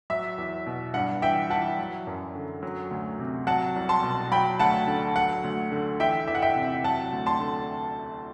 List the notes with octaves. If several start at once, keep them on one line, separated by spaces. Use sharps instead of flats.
F#3 E5
E2
B2
G2 F#5
E3 E5 G5
E3 F#5 A5
F#3
F#2
D3
F#3
D2
C3
F#3 F#5 A5
C2
A5 C6
B2
F#3 G5 B5
D2 F#5 A5
D3
F#3 F#5
D2
D3
E3 E5 G5
E2 E5
F#5
E5 G5
C3
F#3 F#5 A5
D2
A5 C6
D3